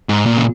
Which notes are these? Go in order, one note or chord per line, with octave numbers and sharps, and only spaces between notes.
G#2
A#2
C#3